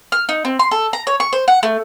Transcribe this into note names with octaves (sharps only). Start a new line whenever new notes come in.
F6
D#4
C4
C6
A4
A#5
C#5
C#6
C5
F#5
A3